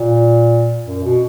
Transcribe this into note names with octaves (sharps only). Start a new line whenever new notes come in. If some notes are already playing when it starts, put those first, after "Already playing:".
Already playing: A#2
F#2
B2